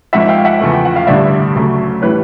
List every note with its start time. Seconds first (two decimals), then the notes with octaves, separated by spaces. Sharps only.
0.13 G#1 G#2 F3 E5 F#5
0.28 F5 G5
0.45 E5 F#5
0.61 E2 C#3 F3 A3
0.73 G5
0.85 F#5
0.96 F5
1.07 A1 G2 D3 G3 D5 E5
1.55 D2 C#3 F#3 A3
2.02 A2 E3 G3 B4 C#5